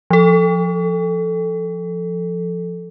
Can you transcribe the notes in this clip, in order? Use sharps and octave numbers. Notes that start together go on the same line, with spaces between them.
F3 A4